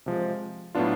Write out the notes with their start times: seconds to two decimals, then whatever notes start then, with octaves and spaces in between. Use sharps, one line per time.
0.06 C3 F3 G#3
0.75 A2 F#3 B3 D4 F4